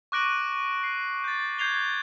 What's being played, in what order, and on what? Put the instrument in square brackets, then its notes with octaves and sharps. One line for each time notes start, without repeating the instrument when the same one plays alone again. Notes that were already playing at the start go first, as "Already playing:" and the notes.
[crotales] C#6 D6 F#6 A#6 D7 F#7
C7
G6 A6
G6 G#6 C7 F7 G7